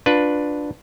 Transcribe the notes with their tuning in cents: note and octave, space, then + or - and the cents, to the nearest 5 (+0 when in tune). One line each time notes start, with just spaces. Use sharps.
D4 +0 F4 +20 B4 -5